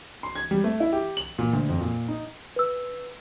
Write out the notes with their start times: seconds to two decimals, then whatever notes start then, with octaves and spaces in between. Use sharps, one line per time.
0.23 C6
0.35 G#6
0.51 G3
0.64 A3
0.80 E4
0.93 G4
1.17 F#7
1.38 A#2
1.53 D2
1.69 F2
1.81 A#2
2.08 D#4
2.56 B4 E6